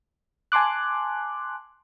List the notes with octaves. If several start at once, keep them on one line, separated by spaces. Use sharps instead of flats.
G#5 A5 C6 D6 F#6